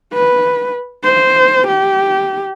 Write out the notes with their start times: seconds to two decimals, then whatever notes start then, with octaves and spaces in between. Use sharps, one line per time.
0.13 B4
1.03 C5
1.67 G4